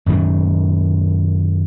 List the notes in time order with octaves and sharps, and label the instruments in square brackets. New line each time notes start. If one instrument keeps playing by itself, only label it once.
[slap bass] F#2 A#2 D#3